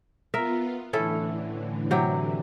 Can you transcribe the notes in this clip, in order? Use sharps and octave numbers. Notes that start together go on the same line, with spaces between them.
B3 F4 A#4 E5
A2 D3 E3 C#4 E4 A4
C3 F#3 G4